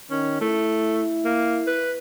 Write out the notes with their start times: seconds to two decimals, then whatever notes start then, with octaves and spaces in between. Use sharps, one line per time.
0.10 D#3 C#4
0.41 A3 E4
1.25 A#3
1.67 B4